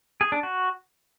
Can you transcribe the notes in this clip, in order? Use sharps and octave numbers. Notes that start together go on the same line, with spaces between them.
G#4
D4
F#4